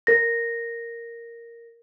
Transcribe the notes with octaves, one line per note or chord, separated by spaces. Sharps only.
A#4 A#6